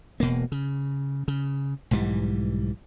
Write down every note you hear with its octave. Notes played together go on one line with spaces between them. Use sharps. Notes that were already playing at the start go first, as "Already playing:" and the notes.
E1 B2 A#3
C#3
C#3
B1 G#2 E3 G3